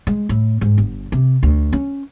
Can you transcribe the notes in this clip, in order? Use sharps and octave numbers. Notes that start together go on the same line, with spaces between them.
G#3
A2
G#2
G1
C3
D2
C#4